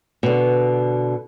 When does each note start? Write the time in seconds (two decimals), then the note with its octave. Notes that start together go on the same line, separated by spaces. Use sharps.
0.23 B2 D3